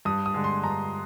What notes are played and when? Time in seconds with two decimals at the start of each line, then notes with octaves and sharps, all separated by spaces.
0.05 G2 D#6
0.26 D#6
0.34 D3 G#3
0.44 C6
0.64 G2 A#5